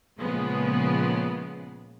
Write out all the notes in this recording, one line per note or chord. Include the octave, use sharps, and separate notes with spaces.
A#2 C#3 F3 G#3 B3